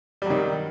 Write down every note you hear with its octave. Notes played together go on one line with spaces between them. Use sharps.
D#3 F#3 G3